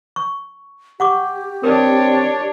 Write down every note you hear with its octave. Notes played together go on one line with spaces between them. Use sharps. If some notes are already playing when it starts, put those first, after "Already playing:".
C#6
G4 F#5 C#6 D6
C4 D4 A#4 C#5